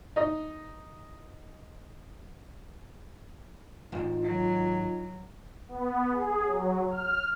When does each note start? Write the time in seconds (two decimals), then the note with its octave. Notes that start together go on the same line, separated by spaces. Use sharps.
0.16 D#4 D#5
3.92 D#1 G#1 D#4 F4
4.24 F#3 D#4
5.68 B3
6.12 G#4
6.44 F#3
6.91 F6